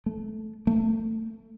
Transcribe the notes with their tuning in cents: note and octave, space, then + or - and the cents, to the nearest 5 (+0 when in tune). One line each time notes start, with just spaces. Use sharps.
A3 -15
A3 +25